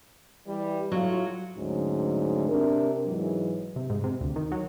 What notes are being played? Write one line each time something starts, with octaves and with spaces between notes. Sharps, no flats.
E3 G3
A2 F#3 F4
D2 G#2 F#3 C#4
C3 D4 A#4
G#2 E3 F#3
C3
G#2
C3
D2
D#3
F#3